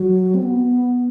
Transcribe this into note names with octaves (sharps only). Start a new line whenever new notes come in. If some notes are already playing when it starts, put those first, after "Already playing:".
Already playing: F#3
C4
B3